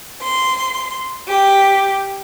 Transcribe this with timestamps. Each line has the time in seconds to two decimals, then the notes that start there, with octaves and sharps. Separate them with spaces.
0.23 C6
1.28 G4